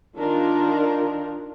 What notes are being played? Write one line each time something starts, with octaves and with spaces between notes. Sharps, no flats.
D#3 D4 F4 A#4